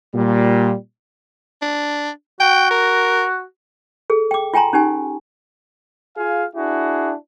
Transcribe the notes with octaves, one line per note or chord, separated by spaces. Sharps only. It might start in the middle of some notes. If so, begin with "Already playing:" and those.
A#2 G3
D4
F#4 G5
A#4
G#4 A4
G5 D6
F4 G5 G#5 A#5 C6
C#4 D#4 G4 G#5
F4 G#4 F5 G#5
D4 E4 F#4 G#4